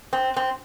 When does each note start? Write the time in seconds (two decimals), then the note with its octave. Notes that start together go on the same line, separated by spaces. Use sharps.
0.13 C4
0.36 C4